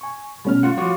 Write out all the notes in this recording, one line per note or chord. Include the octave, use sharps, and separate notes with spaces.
G#5 C#6
B2 G3 A3 C#4 F6
F4 F#5
F3 F4 F#4 C#5 F#5 D6